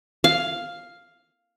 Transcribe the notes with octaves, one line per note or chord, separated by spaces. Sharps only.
F5